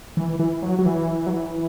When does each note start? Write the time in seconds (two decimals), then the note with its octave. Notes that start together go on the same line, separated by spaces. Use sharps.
0.17 E3
0.39 E3
0.62 F#3
0.79 F#3
0.86 E3
1.27 F#3
1.31 E3